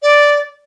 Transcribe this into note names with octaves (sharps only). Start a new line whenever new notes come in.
D5